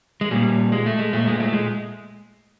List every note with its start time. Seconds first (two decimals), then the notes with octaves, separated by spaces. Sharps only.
0.21 G#3
0.31 A#2 G3
0.72 G#3
0.86 A3
0.99 G#3
1.13 A#2 A3
1.27 G#3
1.40 A3
1.53 G#3